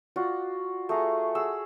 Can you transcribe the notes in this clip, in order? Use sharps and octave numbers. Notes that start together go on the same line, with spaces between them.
F4 F#4 D5
A3 G#4 A#5
G#4 F#5 E6